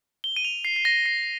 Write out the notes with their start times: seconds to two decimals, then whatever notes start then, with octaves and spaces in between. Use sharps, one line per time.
0.24 G7
0.36 D#7
0.45 F7
0.65 C7
0.76 C7
0.85 A#6
1.06 C7